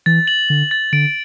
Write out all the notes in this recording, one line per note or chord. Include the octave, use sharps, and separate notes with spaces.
E3 A6
F#7
D3 A6
A6
D3 D7